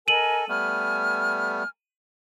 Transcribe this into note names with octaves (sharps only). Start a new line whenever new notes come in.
A4 A#4 D#5 G#5 D#7 F#7
G3 A3 B3 G#5 F6